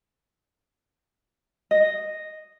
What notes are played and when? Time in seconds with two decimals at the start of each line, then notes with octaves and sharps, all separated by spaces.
1.71 D#5